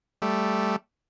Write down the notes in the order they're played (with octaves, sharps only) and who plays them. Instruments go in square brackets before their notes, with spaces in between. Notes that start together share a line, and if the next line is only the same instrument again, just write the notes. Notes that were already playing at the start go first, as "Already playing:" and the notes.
[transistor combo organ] G3 A3